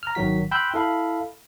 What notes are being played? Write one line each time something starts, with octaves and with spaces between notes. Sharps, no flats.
A#5 F6
G#1 D#3 F#3 F#4 B6
G5 B5 C6 E6 F#6 G6
E4 A4 F5 B5